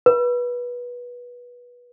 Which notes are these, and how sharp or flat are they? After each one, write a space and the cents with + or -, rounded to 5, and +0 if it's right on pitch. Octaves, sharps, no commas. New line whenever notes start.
B4 -20